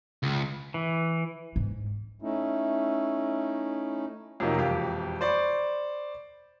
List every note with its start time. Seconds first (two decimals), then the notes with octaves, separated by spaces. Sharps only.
0.23 C#2
0.74 E3
1.56 G#2
2.22 A3 C#4 D#4 E4
4.40 F2 C3 F#3 A#3 D#4
4.58 E1 F2 G4 F5
5.21 C5 D5 B5 C#6